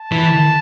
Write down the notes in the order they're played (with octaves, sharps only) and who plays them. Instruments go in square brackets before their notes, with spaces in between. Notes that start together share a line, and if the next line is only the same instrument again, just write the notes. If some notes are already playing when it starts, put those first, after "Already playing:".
Already playing: [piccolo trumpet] A5
[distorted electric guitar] E3